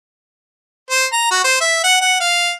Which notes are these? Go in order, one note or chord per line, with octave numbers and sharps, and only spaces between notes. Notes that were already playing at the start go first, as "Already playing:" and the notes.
C5
A#5
F#4
C5
E5
F#5
F#5
F5